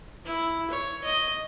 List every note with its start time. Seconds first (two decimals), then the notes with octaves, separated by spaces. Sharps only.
0.25 E4
0.71 C#5
1.04 D#5